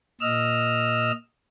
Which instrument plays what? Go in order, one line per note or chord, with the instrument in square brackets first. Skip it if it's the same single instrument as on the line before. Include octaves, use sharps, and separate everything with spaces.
[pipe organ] A#2 D#5 E6 F6